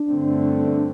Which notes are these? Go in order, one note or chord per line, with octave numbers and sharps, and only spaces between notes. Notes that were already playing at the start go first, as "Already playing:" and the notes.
Already playing: D4
G2 D3 A3 C4
D4